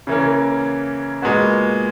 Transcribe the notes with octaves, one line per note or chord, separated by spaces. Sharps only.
C#3 E3 A#3 C#4
A#2 G#3 B3 F#4